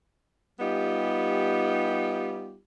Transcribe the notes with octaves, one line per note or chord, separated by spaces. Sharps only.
G3 B3 D#4 F4 G4